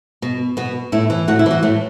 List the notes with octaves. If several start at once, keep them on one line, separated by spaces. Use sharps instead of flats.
B2
B2 B3
A2 E4
E3
A2 F#4
E4
E3 F#4
A2 A3